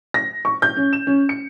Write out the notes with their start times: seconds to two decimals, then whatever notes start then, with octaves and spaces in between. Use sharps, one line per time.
0.14 A#6
0.45 C#6
0.62 G6
0.77 C#4
0.93 E7
1.07 C#4
1.29 C#7